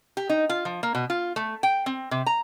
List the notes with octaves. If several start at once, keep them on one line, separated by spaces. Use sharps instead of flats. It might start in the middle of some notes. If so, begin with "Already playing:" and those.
G4
D#4
F4
F3
A#3
B2
F4
A3
G5
C4
C3
A#5